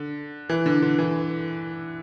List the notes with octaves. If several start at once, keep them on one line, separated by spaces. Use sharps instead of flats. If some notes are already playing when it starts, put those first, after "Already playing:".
Already playing: D3
E3
D3
D3
E3